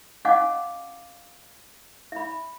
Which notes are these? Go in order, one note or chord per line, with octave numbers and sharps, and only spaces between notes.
C#4 D#5 F5 F#5 G#5 D6
E5 B5